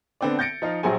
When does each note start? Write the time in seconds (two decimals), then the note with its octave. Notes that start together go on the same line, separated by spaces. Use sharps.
0.21 D3 B3 C4 D4 D5
0.39 G6 A6 A#6 C#7 D7
0.62 F3 D#4 F4
0.83 A#1 F#3 G4 G#4 C5 G#5